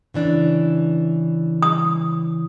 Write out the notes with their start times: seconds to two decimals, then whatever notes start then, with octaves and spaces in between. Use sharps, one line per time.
0.14 C#3 E3 D4
1.63 D#6